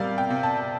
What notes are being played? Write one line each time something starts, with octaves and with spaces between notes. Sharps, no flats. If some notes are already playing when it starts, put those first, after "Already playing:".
Already playing: C3 G3 A#4 D5 F5
G5
C3
A5